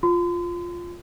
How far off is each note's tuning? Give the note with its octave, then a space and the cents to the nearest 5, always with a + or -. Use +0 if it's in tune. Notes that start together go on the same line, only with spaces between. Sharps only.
F4 +0 C6 -40